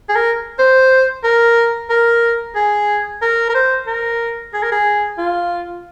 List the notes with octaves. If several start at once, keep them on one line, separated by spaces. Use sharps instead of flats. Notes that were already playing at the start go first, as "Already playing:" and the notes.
G#4
A#4
C5
A#4
A#4
G#4
A#4
A#4
C5
A#4
G#4
A#4
G#4
F4